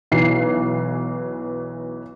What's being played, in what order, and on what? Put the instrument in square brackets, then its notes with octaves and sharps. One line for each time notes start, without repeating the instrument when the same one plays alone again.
[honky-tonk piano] B1 E3 C7